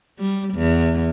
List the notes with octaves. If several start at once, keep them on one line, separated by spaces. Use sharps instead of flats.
G3
E2